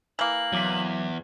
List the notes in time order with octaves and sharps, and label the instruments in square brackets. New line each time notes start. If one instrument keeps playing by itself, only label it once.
[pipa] E3 A#3 [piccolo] F#7
[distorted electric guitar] E2 [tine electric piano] F#3 D6 B6